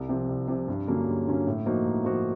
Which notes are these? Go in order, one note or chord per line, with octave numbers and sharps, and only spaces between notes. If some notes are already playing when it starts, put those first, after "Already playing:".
Already playing: C2
C3 F3
C2
C3 F3
G2
D3 F#3 A#3 C#4
G2
D3 F#3 A#3 C#4
A2
F3 A#3 D#4 F#4
A2
F3 A#3 D#4 F#4